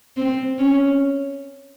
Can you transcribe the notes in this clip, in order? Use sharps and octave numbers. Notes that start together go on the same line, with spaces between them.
C4
C#4